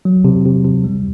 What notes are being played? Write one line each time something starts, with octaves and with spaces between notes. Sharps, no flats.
F#3
C3
C3
C3
G3